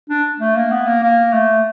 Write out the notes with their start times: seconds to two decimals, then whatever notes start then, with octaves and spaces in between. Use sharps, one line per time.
0.10 D4
0.40 A3
0.56 A#3
0.71 B3
0.87 A#3
1.03 A#3
1.33 A3